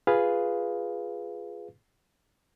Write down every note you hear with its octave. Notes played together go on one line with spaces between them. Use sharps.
F4 G#4 B4 F5